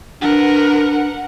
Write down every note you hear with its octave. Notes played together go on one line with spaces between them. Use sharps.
D4 A#4 B4 F#5